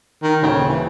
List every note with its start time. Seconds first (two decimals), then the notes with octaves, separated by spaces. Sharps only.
0.23 D#3
0.43 D#1 C#3 G5
0.68 E3